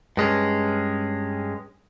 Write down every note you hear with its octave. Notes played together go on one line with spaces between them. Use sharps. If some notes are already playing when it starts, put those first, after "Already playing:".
G2 G#3 C#4